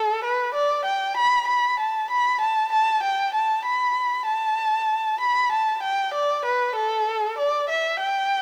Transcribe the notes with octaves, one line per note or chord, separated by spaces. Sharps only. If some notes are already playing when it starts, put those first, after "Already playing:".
Already playing: A4
B4
D5
G5
B5
B5
A5
B5
A5
A5
G5
A5
B5
A5
B5
A5
G5
D5
B4
A4
D5
E5
G5